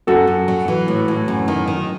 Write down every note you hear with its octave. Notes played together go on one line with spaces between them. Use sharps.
F#2 F#4 A4
F#2
F#3
E3
A2
A2
F#2
D#3
D#3